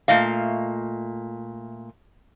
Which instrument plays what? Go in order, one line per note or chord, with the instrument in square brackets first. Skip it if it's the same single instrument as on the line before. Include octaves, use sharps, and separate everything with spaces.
[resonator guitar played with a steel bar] A#2 A3 D#5 F5